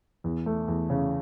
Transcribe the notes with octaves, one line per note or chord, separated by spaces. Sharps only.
E2
A3
E2
C#3